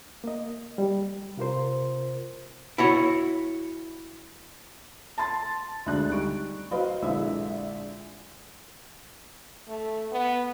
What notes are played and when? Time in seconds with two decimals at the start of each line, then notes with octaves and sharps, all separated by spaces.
0.24 A#3 D#5
0.78 G3
1.37 C3 F4 A#4 C5
2.78 E4 F#4 C#5
5.18 A5 C6 A6
5.86 D2 G#3 D4 F#6
6.10 G3 D#4 C#6 D7
6.71 F#3 F#4 B4 C5 D#5 F5
7.02 A#1 D3 E3 G#3 E5
9.68 A3
10.12 B3